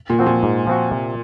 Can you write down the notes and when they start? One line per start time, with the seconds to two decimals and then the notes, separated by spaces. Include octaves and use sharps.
0.10 A#2
0.19 F3 C4 F#4
0.27 A#2
0.43 G#2
0.67 F3 C4 F#4
0.91 C3